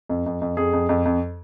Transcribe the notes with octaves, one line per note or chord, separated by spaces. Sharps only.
F2
F2
F2
F2 G#4
F2
F2
F2